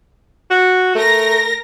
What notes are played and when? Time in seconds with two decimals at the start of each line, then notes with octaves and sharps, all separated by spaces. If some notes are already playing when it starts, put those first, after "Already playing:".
0.50 F#4
0.95 A3 A#4 A#6